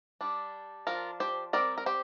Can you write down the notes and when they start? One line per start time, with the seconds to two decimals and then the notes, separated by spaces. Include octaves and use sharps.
0.21 G3 D4
0.87 F3 D4 F4 A#4
1.20 G4 C5
1.53 G3 C4 A#4 D5
1.78 A#4
1.86 G4 C5